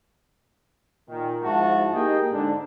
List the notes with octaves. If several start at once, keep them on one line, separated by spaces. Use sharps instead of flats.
A#2 D#3
G#2 F3 E4 F#4 A5
A#3 D#4 G4 G#4 D#5 G5
G#2 D3 D4